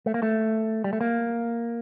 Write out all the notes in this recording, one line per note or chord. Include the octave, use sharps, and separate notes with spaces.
A3
A#3
A3
G3
A3
A#3